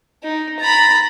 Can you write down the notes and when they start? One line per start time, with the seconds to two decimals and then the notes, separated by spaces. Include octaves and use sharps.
0.23 D#4
0.60 A#5 B5 A6